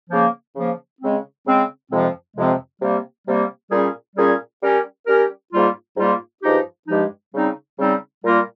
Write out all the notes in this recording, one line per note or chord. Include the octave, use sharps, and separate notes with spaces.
C#3 F3 A#3
C#3 F3 A#3
C#3 G#3 C4
C#3 G#3 C4
F2 C3 F3 G#3 C4
F2 C3 F3 G#3 C4
C3 G3 A#3
C3 G3 A#3
A#2 G3 C#4 G#4
A#2 G3 C#4 G#4
G3 C#4 G4 A#4
G3 C#4 G4 A#4
G#2 G3 A#3 F4
G#2 G3 A#3 F4
G2 F3 G#3 D#4 G4
G2 F3 G#3 D#4 G4
C#3 G3 C4 D#4
C#3 G3 C4 D#4
A#2 G3 A#3 F4 A#4